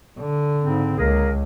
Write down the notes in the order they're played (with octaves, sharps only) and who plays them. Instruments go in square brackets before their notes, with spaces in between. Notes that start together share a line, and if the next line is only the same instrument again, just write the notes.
[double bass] D3
[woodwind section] G#2 C#3 C4
[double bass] C#2 [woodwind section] A#3 G#4 A#4